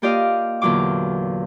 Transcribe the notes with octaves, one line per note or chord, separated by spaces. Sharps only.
A#3 F4 G4 D5 D#5 F5
E2 A#2 D3 F#3 F4 D6